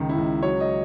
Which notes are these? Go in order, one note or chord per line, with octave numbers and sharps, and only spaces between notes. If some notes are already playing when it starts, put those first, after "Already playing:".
Already playing: C#2 D#3
E4
C#2
F#3 C#5
D#5